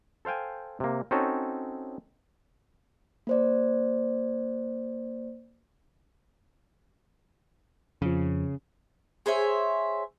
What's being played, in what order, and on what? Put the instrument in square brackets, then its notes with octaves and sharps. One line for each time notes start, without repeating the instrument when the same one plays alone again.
[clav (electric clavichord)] A4 C5 F5 G5 G#5
C3 A#3
C4 C#4 D#4 F#4 A4 C#5
[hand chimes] A#3 C5 D5
[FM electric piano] F2 F3 [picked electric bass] C#3
[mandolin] G#4 C5 C#5 E5